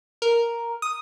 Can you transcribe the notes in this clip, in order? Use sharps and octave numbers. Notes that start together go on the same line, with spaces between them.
A#4
D#6